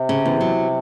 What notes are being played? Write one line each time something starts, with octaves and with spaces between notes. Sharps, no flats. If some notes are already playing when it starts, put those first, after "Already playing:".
Already playing: C3
C#3
E2
F#3